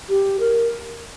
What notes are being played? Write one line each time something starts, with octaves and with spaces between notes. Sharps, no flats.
G4
A#4